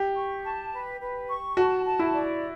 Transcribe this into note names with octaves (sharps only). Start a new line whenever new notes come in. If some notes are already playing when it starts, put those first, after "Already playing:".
Already playing: G4
C#6
A5
B4
B4
C#6
F#4 A5
A5
E4
D5